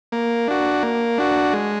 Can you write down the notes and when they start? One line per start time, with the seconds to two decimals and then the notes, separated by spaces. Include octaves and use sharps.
0.12 A#3
0.48 D4 F#4
0.83 A#3
1.18 D4 F#4
1.53 G#3